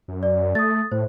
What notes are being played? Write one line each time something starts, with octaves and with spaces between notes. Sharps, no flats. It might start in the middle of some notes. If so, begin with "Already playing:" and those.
F#2
D5
A3 D#6 A6
A2 C5